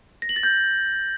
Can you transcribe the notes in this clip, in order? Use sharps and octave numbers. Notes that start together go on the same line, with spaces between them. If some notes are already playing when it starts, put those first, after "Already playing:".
A#6
F#7
A6
G6